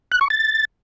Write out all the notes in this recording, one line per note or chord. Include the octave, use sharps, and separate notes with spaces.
F#6
C#6
A6